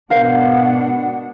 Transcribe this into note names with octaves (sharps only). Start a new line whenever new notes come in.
G#2 B2 D4 A#4 C5 F5 F#5